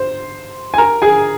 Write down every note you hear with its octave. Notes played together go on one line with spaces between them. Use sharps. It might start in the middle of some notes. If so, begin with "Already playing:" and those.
Already playing: C5
G#5
A#4 A#5
G#4 G#5